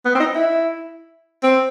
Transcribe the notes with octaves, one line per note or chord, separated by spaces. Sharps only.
B3
C4
D#4
E4
C4